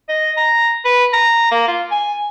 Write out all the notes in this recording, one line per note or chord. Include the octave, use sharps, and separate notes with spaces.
D#5
A#5
B4
A#5
A#3
F4
G#5